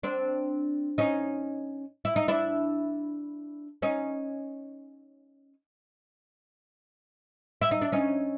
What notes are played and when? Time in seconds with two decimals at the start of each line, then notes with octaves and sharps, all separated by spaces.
0.03 C4 D4
0.98 C#4 D#4
2.05 E4
2.16 D#4
2.28 D4 E4
3.82 C#4 D#4
7.62 E4
7.71 D#4
7.81 D4
7.92 C#4 D#4